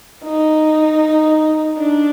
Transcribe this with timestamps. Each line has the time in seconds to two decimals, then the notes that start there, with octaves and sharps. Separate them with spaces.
0.25 D#4
1.78 D4